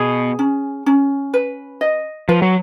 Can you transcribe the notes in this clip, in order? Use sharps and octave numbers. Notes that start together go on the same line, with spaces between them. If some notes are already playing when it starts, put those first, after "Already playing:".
Already playing: B2 G#4
C#4
C#4
B4
D#5
F3 B4
F#3